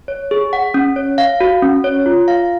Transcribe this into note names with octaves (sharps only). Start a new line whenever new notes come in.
C#5
G#4
F#5
C#4
C#5
F5
F#4
C#4
C#5
F4
F5